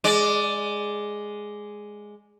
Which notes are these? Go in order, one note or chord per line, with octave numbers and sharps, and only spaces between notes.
G#3 D5